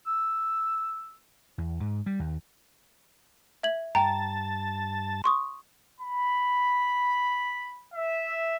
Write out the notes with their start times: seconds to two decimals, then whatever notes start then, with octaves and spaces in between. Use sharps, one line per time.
0.07 E6
1.58 E2
1.80 G#2
2.06 G3
2.19 D#2
3.63 E5 G#6 F#7
3.95 G2 G5 A5 A#5
5.24 C6 C#6 D#6
6.01 B5
7.92 E5